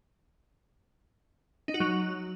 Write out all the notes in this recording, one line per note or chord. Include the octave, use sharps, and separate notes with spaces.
D#4
F#4
F#3